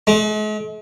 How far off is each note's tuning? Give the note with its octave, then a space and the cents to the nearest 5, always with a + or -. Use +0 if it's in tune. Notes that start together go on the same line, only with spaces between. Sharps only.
G#3 +45